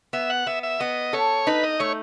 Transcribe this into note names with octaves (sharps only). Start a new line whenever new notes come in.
B3 E5
F#5
B3 E5
E5
B3 D#5
A4 C#5
D#4 B4
D#5
A3 C#5